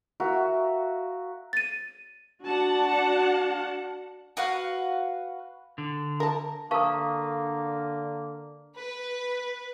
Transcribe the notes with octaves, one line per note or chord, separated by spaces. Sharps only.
F#4 A#4 E5 F5
A6 D#7
D4 F#4 F#5 A5
F#4 B4 F5 F#5
D3
A#4 A5
D3 A#3 A#4 F5 A5 C#6 D#6
B4